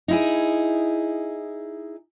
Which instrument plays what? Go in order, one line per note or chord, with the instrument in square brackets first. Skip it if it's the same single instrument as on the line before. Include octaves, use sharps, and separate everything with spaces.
[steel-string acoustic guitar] D#4 E4 G#4